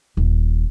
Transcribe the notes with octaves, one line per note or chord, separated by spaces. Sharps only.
D#1